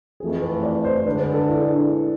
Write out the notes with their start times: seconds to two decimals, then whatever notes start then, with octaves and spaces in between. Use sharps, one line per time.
0.20 F2 E3 A3 G#4
0.42 B4
0.63 D5
0.84 C5
0.97 C5
1.06 D3 G#3 D4 B4
1.20 B4
1.34 A4
1.49 E4